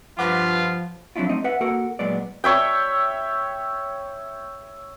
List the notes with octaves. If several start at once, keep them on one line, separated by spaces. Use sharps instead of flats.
G2 F3 F4 B4 F#5 D6
F3 F#3 C4 D4 E4 F4
A3 C4 D#4 D#5
B4 E5 F#5
A#3 F#4 A4 A#4 F#5
A#2 F#3 G#3 B3 D5
C#5 E5 G5